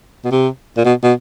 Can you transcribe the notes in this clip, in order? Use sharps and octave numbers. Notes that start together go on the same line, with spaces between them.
B2
C3
A#2
B2
B2